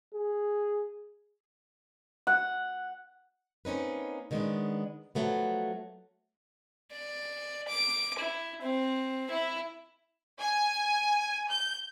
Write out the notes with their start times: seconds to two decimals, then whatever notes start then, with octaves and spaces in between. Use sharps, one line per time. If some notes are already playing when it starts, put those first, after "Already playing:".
0.14 G#4
2.27 F#5
3.65 A#3 C4 C#4 D#4 B4
4.31 D3 D#3 G#3 B3 C#4 D4
5.15 F3 F#3 A3 B3
6.92 D5
7.68 D6
8.19 E4
8.62 C4
9.31 E4
10.39 G#5
11.50 G6